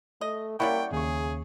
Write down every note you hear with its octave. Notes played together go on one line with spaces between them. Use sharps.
A3 D#5
G3 A#3 C#4 E4 D5 F#5 G5 C#6
D#2 C#3 G#4 C#6